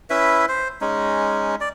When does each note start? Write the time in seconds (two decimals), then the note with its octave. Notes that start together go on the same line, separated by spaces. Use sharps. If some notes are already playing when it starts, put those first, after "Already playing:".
0.10 C#4 E4 B4 E5
0.48 C5
0.81 G#3 C#4 D#4
1.61 D5